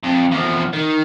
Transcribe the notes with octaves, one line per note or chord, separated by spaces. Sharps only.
F2
E2 F3
D#3